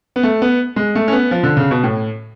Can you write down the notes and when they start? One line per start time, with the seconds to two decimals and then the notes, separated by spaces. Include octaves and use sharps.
0.16 B3
0.23 A3
0.42 B3
0.76 G#3
0.95 A3
1.08 C#4
1.12 B3
1.31 F3
1.43 D3
1.57 C#3
1.71 B2
1.84 A2